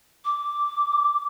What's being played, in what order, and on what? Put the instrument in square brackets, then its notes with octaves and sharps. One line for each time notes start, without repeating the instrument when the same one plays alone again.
[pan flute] D6